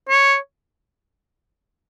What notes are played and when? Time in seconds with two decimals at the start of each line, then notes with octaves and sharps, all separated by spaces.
0.09 C#5